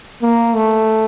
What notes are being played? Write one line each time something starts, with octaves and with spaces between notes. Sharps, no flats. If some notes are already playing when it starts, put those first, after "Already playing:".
A#3
A3